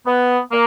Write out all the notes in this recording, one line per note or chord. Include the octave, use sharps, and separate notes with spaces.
B3
A#3